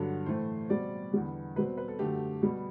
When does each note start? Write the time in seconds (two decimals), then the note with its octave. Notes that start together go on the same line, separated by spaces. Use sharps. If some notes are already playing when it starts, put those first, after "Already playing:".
Already playing: G2 D3 F#3 A4
0.26 A2 E3 A3 C5
0.69 B2 G3 C4 D5
1.12 E2 D3 G3 B3
1.56 B2 G3 C4 B4
1.78 B4
1.88 A4
1.99 F#2 D3 A3 G4
2.42 B2 G3 B3